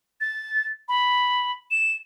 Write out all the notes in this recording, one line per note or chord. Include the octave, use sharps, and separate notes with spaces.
A6
B5
E7